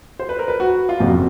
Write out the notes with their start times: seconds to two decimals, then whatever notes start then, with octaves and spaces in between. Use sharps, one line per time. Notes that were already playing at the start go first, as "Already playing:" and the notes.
0.19 C5
0.29 B4
0.39 A#4
0.48 B4
0.60 F#4
0.89 F4
1.00 F#1 F2 C3 F3 F#4